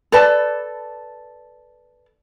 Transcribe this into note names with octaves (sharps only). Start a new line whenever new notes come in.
A4 B4 D5 A5